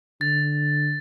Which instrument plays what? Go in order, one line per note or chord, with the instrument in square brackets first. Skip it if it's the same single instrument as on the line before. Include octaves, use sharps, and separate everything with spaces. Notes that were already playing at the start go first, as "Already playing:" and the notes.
[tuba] D3 [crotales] A6